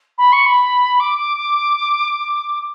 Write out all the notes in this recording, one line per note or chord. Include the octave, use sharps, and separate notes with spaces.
B5
C#6
B5
D6